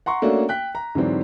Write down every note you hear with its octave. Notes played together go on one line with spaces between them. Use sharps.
F#5 A#5 C6 C#6
A3 A#3 C#4 D4 F#4
G5 F#6 B6
A#5
G#2 D3 E3 F#3 C4 D4